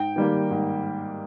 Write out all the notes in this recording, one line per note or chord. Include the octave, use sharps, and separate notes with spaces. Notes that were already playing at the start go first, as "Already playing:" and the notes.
Already playing: G#2 G5
D#3 G3 A#3
G#2